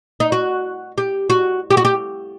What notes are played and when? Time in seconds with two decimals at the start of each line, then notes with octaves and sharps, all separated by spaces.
0.20 D#4
0.32 F#4
0.98 G4
1.30 F#4
1.70 G4
1.77 F#4
1.85 G4